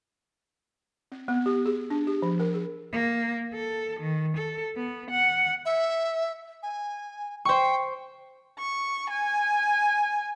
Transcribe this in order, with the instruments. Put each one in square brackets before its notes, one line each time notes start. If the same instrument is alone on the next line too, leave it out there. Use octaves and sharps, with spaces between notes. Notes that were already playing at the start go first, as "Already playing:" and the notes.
[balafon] C4
B3
G4
G#4
D4
G4
F3
A#4
G#4
[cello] A#3
A4
D#3
A4
B3
F#5
[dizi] E5
G#5
[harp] C5 C#6 [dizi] G5
[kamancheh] C#6
G#5